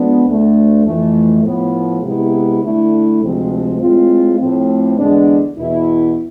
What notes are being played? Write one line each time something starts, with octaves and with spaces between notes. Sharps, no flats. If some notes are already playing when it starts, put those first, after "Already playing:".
Already playing: F3 G#3 B3 D4
D2 D3 A3
F2 E3 A3
A2 F3 B3
C3 G#3 B3 E4
D3 A3 E4
D2 C3 F3 G#3 C4
A2 G#3 C4 F4
A2 F3 A3 C4
E2 D3 G#3 B3 D4
E2 B2 B3 E4